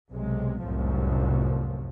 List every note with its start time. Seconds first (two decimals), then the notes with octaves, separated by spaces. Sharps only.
0.11 B1 C3 G#3
0.64 F1 C2 F#2 A2 F3